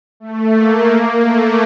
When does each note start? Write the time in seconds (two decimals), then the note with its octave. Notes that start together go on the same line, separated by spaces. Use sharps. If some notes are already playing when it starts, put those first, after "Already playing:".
0.20 A3
0.55 A#3
1.24 A3